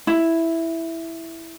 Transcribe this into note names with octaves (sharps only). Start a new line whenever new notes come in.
E4